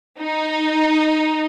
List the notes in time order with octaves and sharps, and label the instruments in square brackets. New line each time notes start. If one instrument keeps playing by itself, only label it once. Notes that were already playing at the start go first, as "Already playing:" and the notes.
[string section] D#4